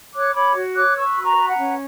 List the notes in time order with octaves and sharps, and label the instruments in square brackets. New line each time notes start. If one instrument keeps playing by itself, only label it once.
[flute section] C#5 D6 F#6
C#5 B5 D6
F#4
C#5 D6 F#6
B4 C#6 E6
F#4
A#5 C#6
B4
F#5 A#5
C#4